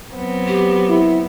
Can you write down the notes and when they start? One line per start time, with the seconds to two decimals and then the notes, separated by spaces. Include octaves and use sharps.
0.15 F#3 B3 C4
0.47 G4
0.89 E4